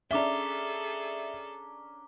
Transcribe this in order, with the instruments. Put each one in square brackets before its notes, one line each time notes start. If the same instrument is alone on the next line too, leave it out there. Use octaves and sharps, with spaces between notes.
[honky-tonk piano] C#4 D4 [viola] G#4 A4 [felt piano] E5 [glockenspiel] A#5 D6 G7